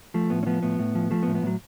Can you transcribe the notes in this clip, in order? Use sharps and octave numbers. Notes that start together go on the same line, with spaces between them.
F3 A3
A2 B3
C#4
F3 B3
A2 B3
A2
F3
F3 A3
B3
A2
B3
A2 F#3